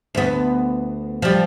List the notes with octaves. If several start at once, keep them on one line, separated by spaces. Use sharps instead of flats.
D2 B3
F3 G3